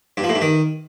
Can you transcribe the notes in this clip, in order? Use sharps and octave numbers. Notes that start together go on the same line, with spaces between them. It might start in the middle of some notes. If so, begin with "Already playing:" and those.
G2
F3
A2
G2
D#3